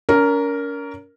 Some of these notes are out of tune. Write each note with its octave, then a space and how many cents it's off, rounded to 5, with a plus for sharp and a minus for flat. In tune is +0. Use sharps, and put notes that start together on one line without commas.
C#4 +40 A#4 +0